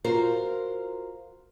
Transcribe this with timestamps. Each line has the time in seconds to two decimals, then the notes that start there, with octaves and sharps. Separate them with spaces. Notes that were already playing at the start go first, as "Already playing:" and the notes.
0.04 F4 F#4 A#4 C5